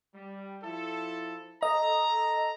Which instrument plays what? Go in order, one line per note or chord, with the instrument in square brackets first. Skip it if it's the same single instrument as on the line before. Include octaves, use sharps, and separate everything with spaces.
[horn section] G3
F3 E4 A4
[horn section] A4 A#5 [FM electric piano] D#5